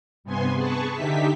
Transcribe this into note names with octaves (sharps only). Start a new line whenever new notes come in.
G2 C3 B3 G#5 C6
G#4 B4 A5 C#6
D3 D#4 G4 E5 B6